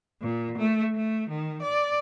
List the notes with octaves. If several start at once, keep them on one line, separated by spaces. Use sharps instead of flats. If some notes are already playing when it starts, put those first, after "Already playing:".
A#2
A3
A3
D#3
D5